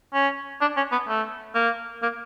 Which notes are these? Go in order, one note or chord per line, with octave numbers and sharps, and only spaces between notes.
C#4
D4
C#4
B3
A3
A#3
A#3